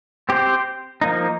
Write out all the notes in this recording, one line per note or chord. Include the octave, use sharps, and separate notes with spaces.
C4 G4 C5
F3 A#3 D#4